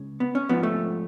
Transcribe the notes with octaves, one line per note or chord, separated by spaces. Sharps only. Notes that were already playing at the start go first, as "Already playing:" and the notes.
Already playing: C#2 C#3
B3
C#4
G#2 F3 B3
A3